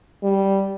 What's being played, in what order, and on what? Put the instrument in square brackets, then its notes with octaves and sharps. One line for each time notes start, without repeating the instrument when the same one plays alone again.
[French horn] G3